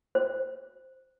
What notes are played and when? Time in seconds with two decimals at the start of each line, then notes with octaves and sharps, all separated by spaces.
0.15 C5